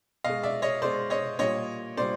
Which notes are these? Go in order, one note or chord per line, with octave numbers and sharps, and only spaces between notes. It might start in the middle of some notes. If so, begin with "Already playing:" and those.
B2 G#3 D#5 F5
D5 E5
C#5 D#5
B2 G#3 C5 D5
C#5 D#5
A#2 G3 C#5 D#5
A#2 G3 C5 D5